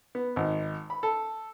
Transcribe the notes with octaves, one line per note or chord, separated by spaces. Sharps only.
B3
G#1
B5
A4